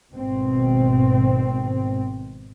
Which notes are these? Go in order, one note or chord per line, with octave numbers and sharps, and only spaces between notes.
G#1 B2 C4